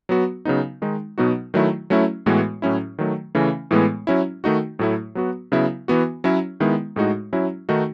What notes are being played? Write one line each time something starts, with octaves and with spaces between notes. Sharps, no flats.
F#3 B3 F#4
C#3 F#3 B3 D#4
D#3 G#3 D#4
B2 F#3 B3 D#4 F#4
D#3 F#3 A3 E4
F#3 A3 C#4 E4
A2 E3 G#3 B3 F#4
A2 F#3 C#4 E4
D#3 F#3 A3
C#3 E3 A3 C#4
A2 E3 G#3 B3
F#3 C#4 E4
D#3 A3 D#4 F#4
A2 F#3 A3 E4
F#3 B3 F#4
C#3 F#3 B3 E4
E3 B3 F#4
F#3 C#4 E4
D#3 G#3 B3 E4
A2 G#3 D#4 F#4
F#3 C#4 E4
D#3 A3 D#4 F#4